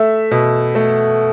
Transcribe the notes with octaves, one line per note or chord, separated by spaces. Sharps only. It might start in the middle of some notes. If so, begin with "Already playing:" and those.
Already playing: A3 E5
B2
A3